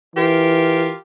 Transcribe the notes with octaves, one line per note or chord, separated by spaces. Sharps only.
E3 F4 G4 A#4